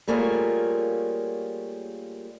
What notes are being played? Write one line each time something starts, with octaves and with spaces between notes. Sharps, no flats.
G3 A3 A#3 F4 G#4 C#5